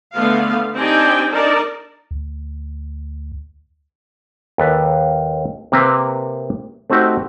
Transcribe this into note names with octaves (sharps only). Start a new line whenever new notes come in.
D3 A3 B3 F5
C4 D4 D#4 G4 G5 G#5
D4 D#4 A#4 D5 A5
D2
D#2 A4 B4
C3 A#3 C4 A#4 B4 A#5
A3 C4 D#4 F#4 G4